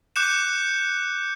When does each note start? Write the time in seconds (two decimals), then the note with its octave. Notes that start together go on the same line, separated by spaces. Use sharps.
0.16 D6 F#6 G6 C#7 E7